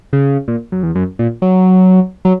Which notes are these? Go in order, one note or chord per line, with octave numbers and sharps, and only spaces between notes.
C#3
A#2
F#2
E2
F#2
A#2
F#3
F#3